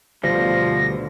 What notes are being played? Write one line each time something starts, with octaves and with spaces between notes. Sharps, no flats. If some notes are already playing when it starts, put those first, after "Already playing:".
D2 B2 D3 F3 G3 A#6